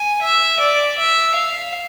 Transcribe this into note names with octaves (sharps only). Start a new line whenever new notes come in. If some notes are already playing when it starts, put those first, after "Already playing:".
Already playing: G#5
E5
D5
E5
F5